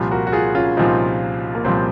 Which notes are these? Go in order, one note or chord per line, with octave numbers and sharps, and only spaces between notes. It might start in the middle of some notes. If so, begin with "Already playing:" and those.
Already playing: C2 A#2 F3
F#4 A#4
F#4
F4 G#4
C#4 F4
C2 A#2 F3 C4 D#4
A#3
C2 A#2 F3 C4